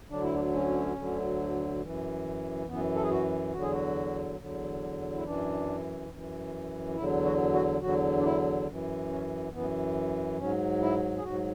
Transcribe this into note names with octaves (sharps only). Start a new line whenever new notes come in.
D2 D3 F#3 D4
E4
D4
C#4
D2 D3 F#3
F#2 E3
F#2 E3 B3
A4
G#4
F#4
E2 D3 F#3 F#4
G#4
F#4
E2 D3 F#3
E4
F#2 E3 D4
F#2 E3
E2 D3 F#3 E4
F#4
F#4
E2 D3 F#3 F#4
D4
E4
F#2 E3
C#4
F#2 E3 B3
G#2 F#3 C#4
E4
G#4
G#2 F#3 F#4